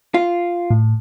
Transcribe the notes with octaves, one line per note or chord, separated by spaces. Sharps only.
F4
A2